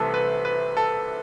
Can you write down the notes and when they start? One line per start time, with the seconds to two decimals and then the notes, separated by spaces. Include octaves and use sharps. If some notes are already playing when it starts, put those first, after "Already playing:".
Already playing: C2 C3 E3 A3 A4 B4
0.14 B4
0.45 B4
0.77 A4